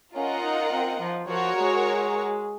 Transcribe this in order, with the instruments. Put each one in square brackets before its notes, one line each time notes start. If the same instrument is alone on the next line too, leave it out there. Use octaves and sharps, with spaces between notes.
[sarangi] C#4 [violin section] F4 A#4 D#5 F#5
[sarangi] D#4
C4
F3
[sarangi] F3 [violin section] F#4 A#4 C#5
[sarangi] G#3